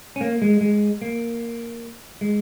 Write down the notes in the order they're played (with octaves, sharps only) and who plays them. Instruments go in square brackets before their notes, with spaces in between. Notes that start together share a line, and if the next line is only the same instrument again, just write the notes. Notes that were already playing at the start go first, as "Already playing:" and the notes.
[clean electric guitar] C#4
A#3
G#3
G#3
A#3
G#3